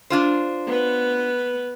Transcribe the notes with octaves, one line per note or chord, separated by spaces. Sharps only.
D4 F4 C5
B3 B4